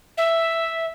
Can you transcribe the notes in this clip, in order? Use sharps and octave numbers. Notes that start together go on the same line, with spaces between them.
E5